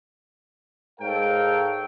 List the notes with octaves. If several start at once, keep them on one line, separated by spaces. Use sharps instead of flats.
G#2 A4 A#4 C#5 F5 G5